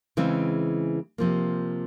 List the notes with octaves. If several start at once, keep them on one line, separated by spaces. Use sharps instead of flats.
C#3 E3 G#3 C4
C3 F3 A#3